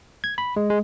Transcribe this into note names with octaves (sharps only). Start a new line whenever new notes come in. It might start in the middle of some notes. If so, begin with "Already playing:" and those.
G#6
B5
G#3
G#3